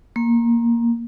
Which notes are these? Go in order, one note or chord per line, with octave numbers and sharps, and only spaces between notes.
A#3